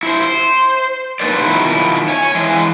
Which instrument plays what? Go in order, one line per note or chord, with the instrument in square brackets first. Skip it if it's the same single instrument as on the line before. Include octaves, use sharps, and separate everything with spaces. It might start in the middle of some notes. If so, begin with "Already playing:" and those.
[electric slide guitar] E4 C5
C5
A#3 D#4 B4 C5 D5
B2 D#3 E4 F4
C#5 G#5
E3 G#3 G#4